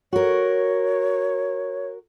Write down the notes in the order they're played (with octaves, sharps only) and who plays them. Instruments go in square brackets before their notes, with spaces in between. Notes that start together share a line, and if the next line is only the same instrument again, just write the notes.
[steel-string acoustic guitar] F#4 A#4 [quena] C#5